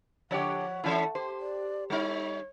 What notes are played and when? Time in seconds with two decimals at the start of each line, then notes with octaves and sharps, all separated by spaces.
0.31 D3 F3 G4 C#5 F#5
0.84 E3 A3 C#4 E4 G#4 A4
1.15 G4 C5
1.40 D5
1.90 G3 D#4 C#5